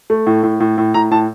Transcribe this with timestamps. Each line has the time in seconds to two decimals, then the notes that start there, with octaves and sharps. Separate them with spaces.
0.10 A3
0.27 A2
0.43 A2
0.60 A2
0.78 A2
0.94 A2 A#5
1.11 A2 A5